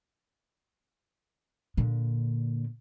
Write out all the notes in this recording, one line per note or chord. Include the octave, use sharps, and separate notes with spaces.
A#2 D3